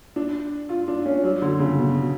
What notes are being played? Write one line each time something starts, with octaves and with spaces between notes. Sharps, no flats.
D4
F4
D4
C#4
F#3
D3
C#3
B2